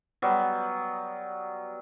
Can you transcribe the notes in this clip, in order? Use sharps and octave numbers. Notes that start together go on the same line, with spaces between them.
F#3 G3 B3